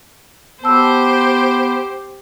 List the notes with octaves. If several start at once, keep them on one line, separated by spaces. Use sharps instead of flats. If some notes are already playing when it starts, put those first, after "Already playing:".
B3 G4 C5 A5 E6